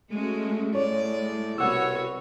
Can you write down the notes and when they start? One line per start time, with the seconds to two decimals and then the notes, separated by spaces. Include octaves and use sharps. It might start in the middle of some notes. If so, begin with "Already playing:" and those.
0.11 G#3 A3 C#4 F#4
0.75 A2 G#3 C#5 D5
1.58 C2 B2 B3 F#4 C#5 F#5 E6